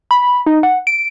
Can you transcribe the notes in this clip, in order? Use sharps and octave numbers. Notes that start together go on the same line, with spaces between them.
B5
D#4
F#5
D7